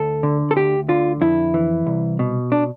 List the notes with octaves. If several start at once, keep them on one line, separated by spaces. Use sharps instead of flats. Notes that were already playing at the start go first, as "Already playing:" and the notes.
Already playing: D2 A4
D3
A4
D2 G4
D3 F4
F2 E4
E3
C2
B2
D4